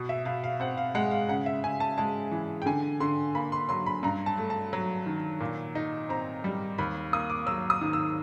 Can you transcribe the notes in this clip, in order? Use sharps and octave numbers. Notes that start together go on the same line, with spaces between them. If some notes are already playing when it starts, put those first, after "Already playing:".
Already playing: B2
E5
B2 F5
F5
C4 F#5
F5
G#3 F#5
F5
C#3 F#5
E5
C#3 G#5
A5
G#3 A5
E3
G5
D3 G#5
D3 C6
A#3 B5
C6
F#3 C6
B5
G2 A#5
A5
A3
A5
F#3
D#3
A#2
D#4
C4 A#5
G3
D#2 B5
A#3 D#6
D6
F#3 E6
D#6
D#3
E6